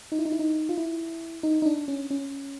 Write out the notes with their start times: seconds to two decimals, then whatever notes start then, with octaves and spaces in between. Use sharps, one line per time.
0.12 D#4
0.19 E4
0.25 D#4
0.32 E4
0.39 D#4
0.69 F4
0.78 E4
1.43 D#4
1.62 D#4
1.66 D4
1.88 C#4
2.10 C#4